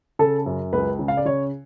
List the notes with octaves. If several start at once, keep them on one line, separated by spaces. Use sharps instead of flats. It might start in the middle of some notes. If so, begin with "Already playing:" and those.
C#3 A4
F#2
C#2 B4
C#3
F5
D5
C#3 C#5